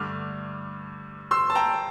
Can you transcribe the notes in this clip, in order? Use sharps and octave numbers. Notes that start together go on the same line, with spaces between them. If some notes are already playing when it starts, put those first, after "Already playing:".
Already playing: G2 D3 A3 D6 F6
C6 E6
A5
G5 A#5